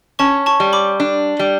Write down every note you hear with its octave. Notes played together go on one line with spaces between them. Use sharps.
C#4 A5 C#6
A5 C#6
G3
B5 D6
D4
G3